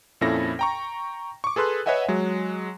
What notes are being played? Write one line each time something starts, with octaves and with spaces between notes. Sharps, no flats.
F2 A#2 C#4 E4 A4 A#6
G5 A#5 C#6
C#6 D6
G#4 A4 B4 C6 F#6
B4 C#5 D#5 E5 F#5 G#5
F#3 G#3